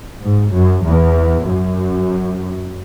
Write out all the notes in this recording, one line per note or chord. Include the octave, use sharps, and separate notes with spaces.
G#2
F#2
E2
F#2